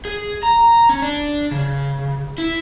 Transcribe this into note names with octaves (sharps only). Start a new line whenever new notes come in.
G#4
A#5
C#4
D4
C#3
E4